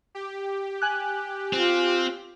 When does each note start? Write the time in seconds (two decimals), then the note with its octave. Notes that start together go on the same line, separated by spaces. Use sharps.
0.15 G4
0.82 G#5 F#6
1.53 C4 F4